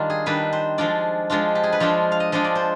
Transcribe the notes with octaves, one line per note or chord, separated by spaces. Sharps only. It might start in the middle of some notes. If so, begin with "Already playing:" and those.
Already playing: D#3 G3 D4 F4
G#4
D#3 G3 D4 B4
C5
F3 G#3 D4 F4 D5
F3 G#3 D4 F4
G4
G#4
B4
F3 G#3 D4 F4 C5
F5
D#5
F3 G#3 D4 F4 D#5
D5
C5